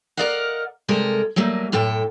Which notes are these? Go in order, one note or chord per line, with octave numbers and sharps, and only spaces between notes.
A#4 B4 D5 D#5 F5 F#5
C3 G3 G#3 A4 A#4
F#3 G3 A3 A#3
F#2 A2 A4 G5